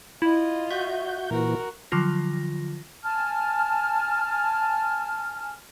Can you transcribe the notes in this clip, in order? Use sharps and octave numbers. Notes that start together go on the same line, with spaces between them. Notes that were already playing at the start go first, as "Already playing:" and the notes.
E4 F4 D#5
F#4 E5 G6
A#2 E3 F#4 A#4
D3 F3 F#3 F4 A#6
G#5 A5 F6